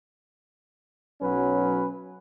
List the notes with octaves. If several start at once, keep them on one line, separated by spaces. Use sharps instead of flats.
B1 F#3 C#4 B4